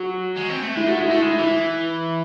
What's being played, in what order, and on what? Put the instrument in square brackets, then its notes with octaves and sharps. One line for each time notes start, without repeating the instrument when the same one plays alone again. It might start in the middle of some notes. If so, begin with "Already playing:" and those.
Already playing: [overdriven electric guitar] F#3 [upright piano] F#4
[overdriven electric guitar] G#3
C4
A3
[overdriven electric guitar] G#3 [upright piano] E4
[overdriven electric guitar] A3 [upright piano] F#4
[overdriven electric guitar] G#3 [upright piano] E4
[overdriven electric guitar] A3 [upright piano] E4
[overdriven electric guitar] G#3 [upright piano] E4
[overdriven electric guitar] E3 [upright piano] E4